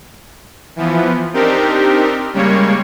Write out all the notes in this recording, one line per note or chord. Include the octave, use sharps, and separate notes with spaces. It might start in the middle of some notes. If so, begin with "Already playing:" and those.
E3 F3 B3
C4 D4 D#4 G4 A#4
C#3 G3 G#3 A#3 C#5